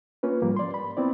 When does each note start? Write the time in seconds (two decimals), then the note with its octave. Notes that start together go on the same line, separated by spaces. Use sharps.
0.23 A#3 C#4 F4 B4
0.42 G#2 F3 G3 A#3
0.56 D5 C6
0.74 B5
0.97 B3 C4 E4 D5